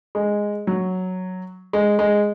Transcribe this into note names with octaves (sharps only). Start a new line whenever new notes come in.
G#3
F#3
G#3
G#3